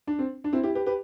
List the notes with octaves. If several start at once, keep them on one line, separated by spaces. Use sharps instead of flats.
D4
C4
D4
C4 E4
E4 G4
G4 B4
G4 B4